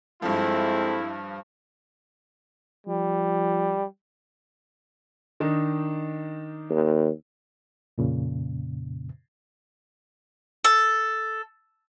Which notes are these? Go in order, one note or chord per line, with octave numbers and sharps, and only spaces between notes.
G2 F3 G#3 C4 E4 A4
F3 G3
D#3 D4 D#4
D#2
F2 A#2 C#3
A4